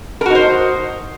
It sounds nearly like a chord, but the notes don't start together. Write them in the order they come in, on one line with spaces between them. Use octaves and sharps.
A#4 F#4 D#4 C5